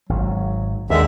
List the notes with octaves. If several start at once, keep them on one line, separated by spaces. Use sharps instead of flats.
G#1 F#3
D#2 D3 D#3 G#3 E5